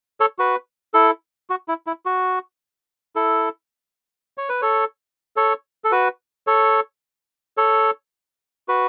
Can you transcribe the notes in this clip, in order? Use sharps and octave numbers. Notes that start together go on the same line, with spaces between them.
A4 C#5
F#4 B4
E4 A4
F#4
E4
E4
F#4
E4 A4
C#5
B4
A4 C#5
A4 C#5
A4
F#4 B4
A4 C#5
A4 C#5
F#4 B4